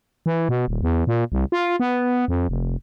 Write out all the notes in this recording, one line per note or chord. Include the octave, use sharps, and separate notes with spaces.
E3
B2
D#1
E2
A#2
C2
F4
B3
F2
F1